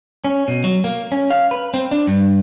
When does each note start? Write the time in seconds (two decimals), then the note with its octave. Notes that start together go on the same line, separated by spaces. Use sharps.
0.25 C#4
0.48 B2
0.64 F#3
0.84 A#3
1.12 C#4
1.30 F5
1.51 B4
1.74 C4
1.91 D4
2.07 G2